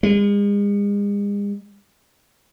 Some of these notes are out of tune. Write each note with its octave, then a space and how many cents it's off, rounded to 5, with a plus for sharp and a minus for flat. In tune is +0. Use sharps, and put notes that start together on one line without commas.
G#3 -40